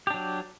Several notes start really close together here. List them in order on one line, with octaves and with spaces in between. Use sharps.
G4 D4 F#3